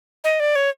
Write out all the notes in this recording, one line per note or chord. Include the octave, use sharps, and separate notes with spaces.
D#5
D5
C#5